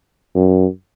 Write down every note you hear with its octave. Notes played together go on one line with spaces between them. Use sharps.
F#2